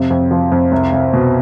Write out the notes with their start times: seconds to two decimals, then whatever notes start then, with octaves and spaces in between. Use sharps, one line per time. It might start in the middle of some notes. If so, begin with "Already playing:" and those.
Already playing: F2 C3
0.10 F2
0.31 F3
0.52 F2
0.72 C2
0.92 C2
1.13 B2